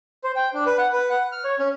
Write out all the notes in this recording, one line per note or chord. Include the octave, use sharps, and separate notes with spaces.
C5
G5
D4
B4
F#5
B4
F#5
F6
C#5
C#4